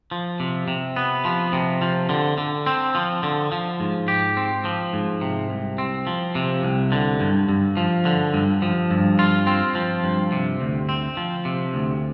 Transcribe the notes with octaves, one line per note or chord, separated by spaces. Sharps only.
F3
C3
C3
B3
F3
C3
F3
D3
D3
C4
F3
D3
F3
G#2
G4
C4
F3
G#2
C3
C2
C4
F3
C3
C2
D3
G2
G2
F3
D3
G2
F3
G2
F4
C4
F3
G2
C3
D2
C4
F3
C3
D2